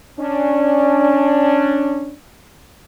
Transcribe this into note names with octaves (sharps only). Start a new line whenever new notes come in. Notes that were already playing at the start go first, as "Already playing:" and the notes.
C#4 D4